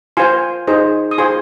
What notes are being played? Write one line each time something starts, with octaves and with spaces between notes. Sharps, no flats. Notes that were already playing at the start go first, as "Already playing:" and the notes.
F4 C5 G#5 C6
D#4 G#4 C5
D#6
F4 G#4 C5 G#5 C6